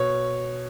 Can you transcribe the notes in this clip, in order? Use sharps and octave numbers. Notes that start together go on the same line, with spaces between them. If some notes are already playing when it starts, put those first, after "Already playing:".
Already playing: B2 C#5